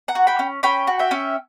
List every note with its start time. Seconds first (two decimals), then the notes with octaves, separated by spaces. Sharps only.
0.08 F#5 A#5
0.15 F#4
0.27 G5 B5
0.39 C#4
0.63 C#4 G5 B5
0.87 F#4
0.99 E5 G5
1.11 C#4